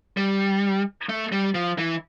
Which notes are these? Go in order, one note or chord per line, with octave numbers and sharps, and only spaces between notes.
G3
A3
G3
F3
E3